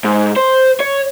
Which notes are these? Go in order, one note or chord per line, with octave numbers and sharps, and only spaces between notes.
G#2
C5
C#5